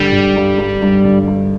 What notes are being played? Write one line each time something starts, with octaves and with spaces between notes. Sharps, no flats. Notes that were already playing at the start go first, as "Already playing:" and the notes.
Already playing: D3 G3
D3
G2
G2
G2
D3
G2